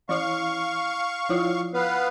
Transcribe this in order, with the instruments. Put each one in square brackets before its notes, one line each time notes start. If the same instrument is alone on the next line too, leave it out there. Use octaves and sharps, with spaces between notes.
[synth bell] E3 E4 [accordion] F5 C#6
[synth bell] F3 E4 F4
[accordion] B3 B4 F5